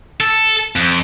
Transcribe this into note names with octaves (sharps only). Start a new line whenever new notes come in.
A4
F2